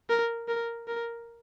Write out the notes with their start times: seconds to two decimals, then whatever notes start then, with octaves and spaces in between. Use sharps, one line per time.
0.09 A#4
0.48 A#4
0.87 A#4